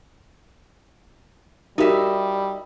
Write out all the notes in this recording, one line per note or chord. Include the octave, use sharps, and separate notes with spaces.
G3 D#4 F#4 G4 A#4 E5